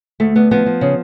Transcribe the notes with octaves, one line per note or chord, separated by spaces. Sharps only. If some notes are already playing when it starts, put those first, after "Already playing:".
D2 A3
D2 B3
F3 B3
F3
C#3